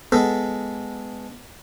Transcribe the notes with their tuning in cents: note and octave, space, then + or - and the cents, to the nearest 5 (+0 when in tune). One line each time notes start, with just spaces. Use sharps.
G#3 +0 B3 +15 A4 +0